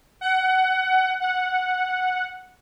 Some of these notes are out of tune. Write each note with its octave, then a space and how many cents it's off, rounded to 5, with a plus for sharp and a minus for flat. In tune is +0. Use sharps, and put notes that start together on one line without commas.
F#5 +20
F#5 -5